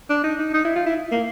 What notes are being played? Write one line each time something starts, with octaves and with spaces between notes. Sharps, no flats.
D4
D#4
D#4
D#4
E4
F4
E4
A#3